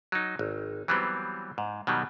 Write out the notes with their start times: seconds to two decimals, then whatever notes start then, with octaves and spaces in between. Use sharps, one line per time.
0.12 F#3 D#4
0.39 G#1
0.88 E3 F#3 G3 B3 C4
1.58 G#2
1.87 B2 D#3 F#3 G3